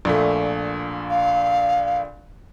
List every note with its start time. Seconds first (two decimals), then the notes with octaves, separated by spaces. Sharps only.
0.05 A#1 A#2 A3
1.10 F5